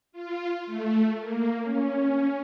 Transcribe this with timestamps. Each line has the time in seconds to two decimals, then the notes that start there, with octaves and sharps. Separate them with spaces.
0.12 F4
0.66 A3
1.19 A#3
1.62 C#4